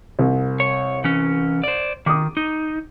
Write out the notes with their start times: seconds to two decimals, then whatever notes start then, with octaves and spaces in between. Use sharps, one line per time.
0.19 C2
0.60 C#5
1.04 E3 C#4
1.64 C5 D5
2.06 D#3 D6 D#6
2.37 D#4